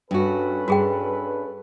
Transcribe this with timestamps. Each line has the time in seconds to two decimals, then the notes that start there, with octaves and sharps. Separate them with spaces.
0.11 G2 C#4 F#4 A4 B4
0.68 G2 F#4 G#4 G5